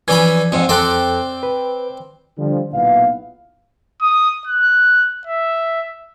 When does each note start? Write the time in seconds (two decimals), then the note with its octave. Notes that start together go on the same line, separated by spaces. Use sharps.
0.08 E3 F3 C#4 D5 B5 G#6
0.52 F2 G#2
0.69 F2 C4 A4 D5 F#6
1.43 B4
2.38 D3 F3 G3
2.73 B1 A#2 B3 E4 F5
4.01 D#6
4.47 F#6
5.27 E5